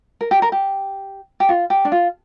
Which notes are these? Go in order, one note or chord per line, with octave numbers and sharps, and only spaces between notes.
A#4
G4
A#4
G4
G4
F4
G4
D4
F4